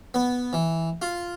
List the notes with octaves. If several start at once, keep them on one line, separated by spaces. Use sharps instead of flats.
B3
E3
F4